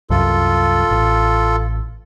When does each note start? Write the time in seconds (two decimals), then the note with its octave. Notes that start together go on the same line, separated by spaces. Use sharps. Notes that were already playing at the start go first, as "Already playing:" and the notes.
0.10 C2 F#2 F4 A4
0.91 A1